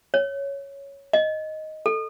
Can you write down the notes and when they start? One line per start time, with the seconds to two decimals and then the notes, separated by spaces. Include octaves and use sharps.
0.14 C#5
1.13 D#5
1.86 A4